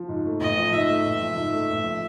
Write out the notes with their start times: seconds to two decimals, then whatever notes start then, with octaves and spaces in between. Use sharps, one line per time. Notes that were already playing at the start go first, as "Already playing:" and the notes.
Already playing: F3
0.09 G#2
0.25 A3
0.41 A1 D#5
0.57 F3
0.73 G#2 E5
0.90 A3
1.05 A1
1.21 F3
1.36 G#2
1.53 A3
1.69 A1
1.84 F3